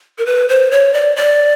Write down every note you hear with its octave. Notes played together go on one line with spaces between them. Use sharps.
A#4
B4
C5
C#5
D5
D5